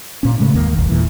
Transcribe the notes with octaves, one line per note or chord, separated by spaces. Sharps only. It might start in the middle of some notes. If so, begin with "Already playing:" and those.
A#2 C#4
A2 C#3 G#3 A3
G1 D#2 D#3 A#3
D#1 G#1 D#2 G#2
E2 A#2 E3